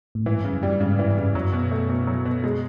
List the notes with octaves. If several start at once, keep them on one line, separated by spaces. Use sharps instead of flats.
A2
G#2 E3
G2
C#3
F#2
G3
G2
G#2 C#3
E3
G2
C#3
F#2 F#3
B2
A3
B2
F#3
B2
G#3